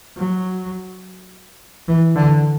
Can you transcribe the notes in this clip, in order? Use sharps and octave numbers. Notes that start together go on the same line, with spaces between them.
F#3
E3
D3